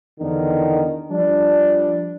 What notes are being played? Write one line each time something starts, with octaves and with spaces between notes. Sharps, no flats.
E2 D3 D#3
F3 G3 D4